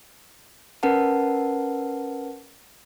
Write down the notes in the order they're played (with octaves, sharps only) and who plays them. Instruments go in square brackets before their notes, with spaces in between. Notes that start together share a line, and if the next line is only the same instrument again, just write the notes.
[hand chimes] C#4 A#4 B4 F#5 A5